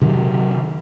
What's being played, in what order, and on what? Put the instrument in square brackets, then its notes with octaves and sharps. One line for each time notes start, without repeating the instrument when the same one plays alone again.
[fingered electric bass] C3 D#3 F#3